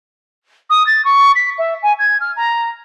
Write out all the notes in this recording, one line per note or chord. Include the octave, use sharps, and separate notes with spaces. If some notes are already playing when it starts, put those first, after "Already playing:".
D#6
A6
C#6
B6
E5
G#5
G#6
F6
A#5